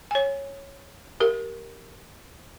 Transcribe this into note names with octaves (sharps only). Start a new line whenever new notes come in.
C#5 G#5
G4 A#4